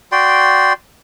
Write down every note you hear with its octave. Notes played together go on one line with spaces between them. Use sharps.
F#4 D5 G5 C6